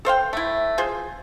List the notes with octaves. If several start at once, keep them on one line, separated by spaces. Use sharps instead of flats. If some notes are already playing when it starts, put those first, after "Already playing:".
A4 C5 F5 G5
A3 E4
F4 G#4 C5